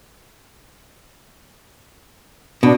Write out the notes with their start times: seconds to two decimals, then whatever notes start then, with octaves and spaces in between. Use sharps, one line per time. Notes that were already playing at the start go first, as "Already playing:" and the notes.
2.63 B2 D4